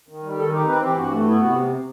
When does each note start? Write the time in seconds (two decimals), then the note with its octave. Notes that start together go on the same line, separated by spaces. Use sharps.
0.08 D#3
0.23 G3
0.38 D#3 A4
0.52 D#4 G4
0.67 C4 B4
0.82 E3 G4
0.97 G2 F#4
1.11 A3
1.27 B3 E4
1.41 C3 F#4